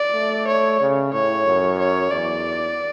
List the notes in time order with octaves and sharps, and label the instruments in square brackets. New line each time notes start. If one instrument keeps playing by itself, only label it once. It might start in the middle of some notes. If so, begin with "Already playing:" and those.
Already playing: [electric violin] D5
[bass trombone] A3
[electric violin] C#5
[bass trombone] C#3
[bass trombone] A2 [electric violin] C#5
[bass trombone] F#2
[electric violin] C#5
[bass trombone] E2 [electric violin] D5